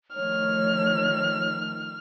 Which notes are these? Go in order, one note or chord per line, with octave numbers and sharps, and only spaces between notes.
D#3 F3 A3 C#5 F6